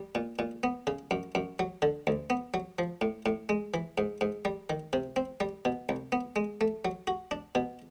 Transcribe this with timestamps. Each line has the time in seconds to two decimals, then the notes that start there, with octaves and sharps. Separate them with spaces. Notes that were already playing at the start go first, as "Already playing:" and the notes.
Already playing: G3
0.15 A#2
0.39 A#2
0.63 B3
0.87 C#3
1.11 F#2
1.35 F#2
1.59 F#3
1.82 D3
2.07 D2
2.30 B3
2.54 F#3
2.79 F3
3.01 A2
3.26 A2
3.49 G#3
3.74 E3
3.98 G#2
4.21 G#2
4.45 G3
4.70 D#3
4.93 C3
5.16 C4
5.40 G3
5.65 B2
5.89 C2
6.12 B3
6.36 G#3
6.61 A3
6.85 F#3
7.07 F#4
7.31 D4
7.55 B2